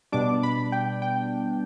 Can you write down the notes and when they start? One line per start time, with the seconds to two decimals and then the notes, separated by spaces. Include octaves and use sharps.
0.12 B2 G3 D4 D6
0.43 B5
0.72 G5
1.02 G5